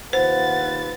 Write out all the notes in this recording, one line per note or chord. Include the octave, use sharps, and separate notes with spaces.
D#2 F4 B4 C5 F#5 A6